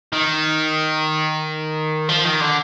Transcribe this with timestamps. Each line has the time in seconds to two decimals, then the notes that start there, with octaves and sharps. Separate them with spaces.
0.13 D#3
2.09 F3
2.25 D#3
2.40 D3